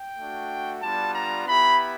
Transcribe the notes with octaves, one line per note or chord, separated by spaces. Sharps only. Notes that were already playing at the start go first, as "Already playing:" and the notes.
Already playing: G5
A3 D4 F#4
G3 B3 D4 F4 A5
A#5
B3 E4 G4 B5